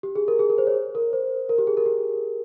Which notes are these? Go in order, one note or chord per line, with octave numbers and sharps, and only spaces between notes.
G4
G#4
A#4
G#4
A#4
C5
C#5
A#4
C5
A#4
G4
G#4
A#4
G4